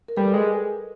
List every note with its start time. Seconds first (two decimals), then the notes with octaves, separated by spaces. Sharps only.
0.08 A#4
0.17 G3 A4 B4
0.34 G#3